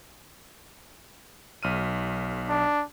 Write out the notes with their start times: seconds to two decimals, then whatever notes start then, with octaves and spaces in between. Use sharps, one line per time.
1.63 B1 F6 D#7
2.49 D4